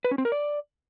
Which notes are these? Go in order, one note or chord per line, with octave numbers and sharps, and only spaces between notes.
B4
C#4
C4
A#4
D5